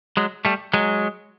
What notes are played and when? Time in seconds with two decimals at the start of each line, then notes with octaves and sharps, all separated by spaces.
0.17 F#3 G#3
0.45 G3 A3
0.73 F#3 G#3